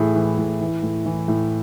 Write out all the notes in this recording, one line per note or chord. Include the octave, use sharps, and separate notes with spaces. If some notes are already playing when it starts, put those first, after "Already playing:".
Already playing: A2 E3 G#4
E3
A2
E3
A2
E3
A2